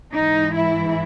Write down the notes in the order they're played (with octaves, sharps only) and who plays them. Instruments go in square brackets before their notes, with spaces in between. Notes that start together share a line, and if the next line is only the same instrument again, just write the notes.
[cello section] G#2 E3 D#4
E4